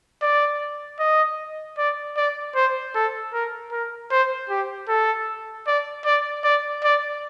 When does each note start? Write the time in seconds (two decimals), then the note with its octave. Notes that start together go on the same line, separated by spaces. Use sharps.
0.22 D5
0.99 D#5
1.78 D5
2.17 D5
2.55 C5
2.95 A4
3.33 A#4
3.72 A#4
4.11 C5
4.50 G4
4.88 A4
5.67 D5
6.05 D5
6.44 D5
6.84 D5